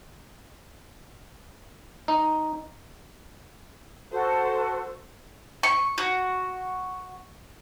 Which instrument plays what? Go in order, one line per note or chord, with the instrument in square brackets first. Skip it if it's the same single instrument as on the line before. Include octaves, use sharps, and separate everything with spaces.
[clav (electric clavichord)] D#4
[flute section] F#4 A4 [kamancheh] C5
[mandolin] C#6
F#4